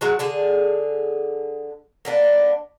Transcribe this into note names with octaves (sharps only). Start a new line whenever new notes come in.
F#3 G#3 F#4
D3 G#4 A5
A#3 B3 D4